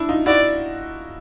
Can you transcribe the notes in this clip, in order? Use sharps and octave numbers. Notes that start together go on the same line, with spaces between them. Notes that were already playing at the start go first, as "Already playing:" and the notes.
Already playing: D4 E4
D#4 F4
E4 F#4 D5